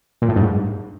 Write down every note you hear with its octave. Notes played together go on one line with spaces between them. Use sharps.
A#2
A2
G2
G#2